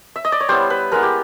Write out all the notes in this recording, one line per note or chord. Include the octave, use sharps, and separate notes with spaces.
E5
D#5
D5
C#5
G3 B3 E4 C5
B4
G#3 B3 E4 A#4
G4